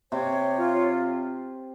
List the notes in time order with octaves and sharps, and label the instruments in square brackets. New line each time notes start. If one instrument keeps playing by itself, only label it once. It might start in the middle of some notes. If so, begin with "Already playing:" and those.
[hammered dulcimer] C3 [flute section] C#5
[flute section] F4